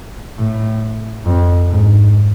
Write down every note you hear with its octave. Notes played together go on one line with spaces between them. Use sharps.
A2
F2
G#2